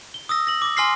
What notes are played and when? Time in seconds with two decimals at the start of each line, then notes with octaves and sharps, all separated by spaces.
0.14 G7
0.29 D#6 E6 A#6
0.47 A#6 F#7
0.62 D6 A#6
0.77 G#5 C6 F6 A#6 C7